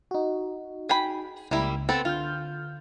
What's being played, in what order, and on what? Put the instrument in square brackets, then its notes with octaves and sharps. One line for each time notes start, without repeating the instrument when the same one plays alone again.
[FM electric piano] D#4 F#4
[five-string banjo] G#4 G5 B5
[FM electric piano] C#2 [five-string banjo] G3 A#3 E4
[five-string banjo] B3 C4 A4
[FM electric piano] D3 F6 G6 [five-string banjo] F4